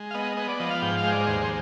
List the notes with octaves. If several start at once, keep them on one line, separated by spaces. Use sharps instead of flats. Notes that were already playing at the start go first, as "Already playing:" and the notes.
Already playing: G#3
F5
B3 D#5
B3 D#5
D5
F3 D#5
F5
G#2 G5
F5
G#3 C5
D5
D#2 C5
C5